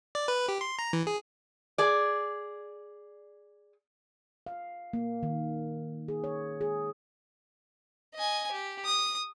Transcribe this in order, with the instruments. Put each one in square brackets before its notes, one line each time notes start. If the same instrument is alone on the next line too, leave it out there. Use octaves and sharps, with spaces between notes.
[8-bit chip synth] D5
B4
G4
C6
A#5
E3
G#4
[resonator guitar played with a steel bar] G#4 D5
[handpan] F5
A#3
D#3
G#4
C#5
G#4
[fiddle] D#5 G#5
G4
D#6